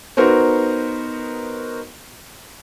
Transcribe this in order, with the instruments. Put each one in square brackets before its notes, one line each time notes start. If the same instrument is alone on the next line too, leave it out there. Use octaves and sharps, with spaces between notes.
[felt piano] B3 D#4 F#4 A#4 C5